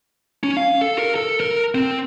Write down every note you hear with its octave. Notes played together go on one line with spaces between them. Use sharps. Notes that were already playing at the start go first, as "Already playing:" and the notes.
C#4
F5
A4
A#4
A4
A#4
C4